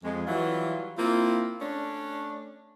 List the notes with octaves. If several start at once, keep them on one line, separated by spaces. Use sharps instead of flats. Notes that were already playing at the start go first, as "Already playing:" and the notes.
F2 G#3
E3 F#3 G3 E4 F4
A#3 C4 E4 F4
A3 C#4 D4